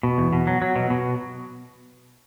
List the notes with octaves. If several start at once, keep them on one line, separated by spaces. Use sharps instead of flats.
B2
E2
B2
F#3
F#3
B2
B2